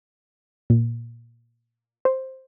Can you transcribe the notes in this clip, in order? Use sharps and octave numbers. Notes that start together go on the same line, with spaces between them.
A#2
C5